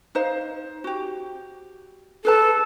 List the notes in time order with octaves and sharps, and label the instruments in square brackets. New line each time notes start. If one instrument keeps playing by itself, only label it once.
[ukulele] D#4 C5 F5
F#4 G4
[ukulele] G#4 B4 A5 [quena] A4